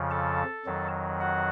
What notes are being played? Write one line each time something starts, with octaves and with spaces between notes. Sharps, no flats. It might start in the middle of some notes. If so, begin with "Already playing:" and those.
Already playing: F2 C#3 F3
A4 A5
F2 D#3 F#3
F#4 F#5